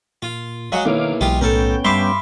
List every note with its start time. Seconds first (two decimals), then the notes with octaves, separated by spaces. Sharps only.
0.22 A#2 F4
0.72 F#3 G#3 F#4 F5
0.85 B1 D#3 A#3 E4 C#5 F5 D6
1.21 B1 B2 E3 G#3 F4 G4
1.41 A1 B3 C#4 A4 A#4 G5
1.85 G2 E5 F5 B5 C6 D6 G7